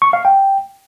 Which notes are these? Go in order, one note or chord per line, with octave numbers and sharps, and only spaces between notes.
C#6
F5
G5